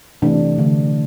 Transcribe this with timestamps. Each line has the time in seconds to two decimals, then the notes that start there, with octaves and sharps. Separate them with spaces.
0.22 C3 E3 A3 D4
0.58 D3 A3